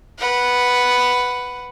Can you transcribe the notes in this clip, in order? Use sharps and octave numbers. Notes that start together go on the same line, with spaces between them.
B4 F#5